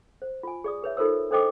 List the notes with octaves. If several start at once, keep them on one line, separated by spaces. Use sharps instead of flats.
C5
F4 G#5
G#4 D5 D#6
G#4 B4 C#5 E5
D#4 F4 A4 A#4 C5 E6
D4 A4 C5 D#5 G5 D6